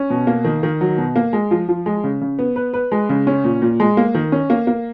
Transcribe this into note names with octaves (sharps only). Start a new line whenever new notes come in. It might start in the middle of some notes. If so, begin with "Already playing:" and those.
Already playing: C#4
B2
A#3
D#3
D#3
F#3
B2
A#3
G#3
F3
F3
G#3
C#3
C#3
B3
B4
B4
G#3
C#3
C#4
A#2
A#2
G#3
A#3
D#3
C#4
A#3
A#3